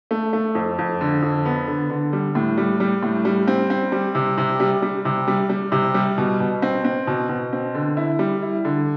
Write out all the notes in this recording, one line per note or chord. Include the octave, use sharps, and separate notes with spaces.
A3
A3
F2
F2
D3
F2
B3
D3
D3
G3
A2
G3
G3
A2
G3
C4
C4
G3
C3
C3
G3
G3
C3
G3
G3
C3
G3
B2
B2
C4
C4
B2
B2
C4
D3
E4
G3
E4
D3